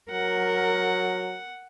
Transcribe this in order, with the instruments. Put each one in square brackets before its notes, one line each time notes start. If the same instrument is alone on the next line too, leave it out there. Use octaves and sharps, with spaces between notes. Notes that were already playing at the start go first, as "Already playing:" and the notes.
[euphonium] F#3 [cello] A#4 [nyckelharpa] F#5